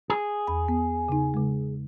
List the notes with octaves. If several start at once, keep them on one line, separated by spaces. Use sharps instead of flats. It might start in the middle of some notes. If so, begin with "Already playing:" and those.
G#4
E2 G#5 B5
B3
C#3 D#4
C#3 G#3